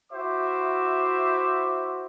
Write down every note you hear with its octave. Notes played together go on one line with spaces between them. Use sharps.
E4 F#4 C5 E5 D6